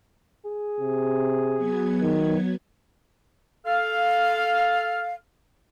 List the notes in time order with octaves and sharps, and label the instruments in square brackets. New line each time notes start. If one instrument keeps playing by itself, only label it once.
[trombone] G#4
[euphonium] C3
[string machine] F#3 B3 G#6
[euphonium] D#3
[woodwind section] A4 F5